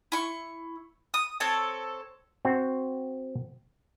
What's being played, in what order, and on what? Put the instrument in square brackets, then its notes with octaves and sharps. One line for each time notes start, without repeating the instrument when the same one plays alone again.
[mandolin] E4 C#6
D#6
C4 A4 C#5 A5
[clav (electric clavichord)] C4 F#4